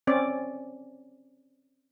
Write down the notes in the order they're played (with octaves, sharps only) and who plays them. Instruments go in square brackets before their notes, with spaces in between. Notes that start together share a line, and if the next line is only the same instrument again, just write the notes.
[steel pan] C4 C#4 D5